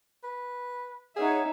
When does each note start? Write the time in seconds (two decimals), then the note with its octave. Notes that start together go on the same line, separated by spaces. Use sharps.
0.24 B4
1.17 D#4 G#4 C#5 E5 F#5